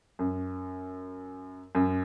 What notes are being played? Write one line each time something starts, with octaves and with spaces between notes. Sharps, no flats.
F#2
F#2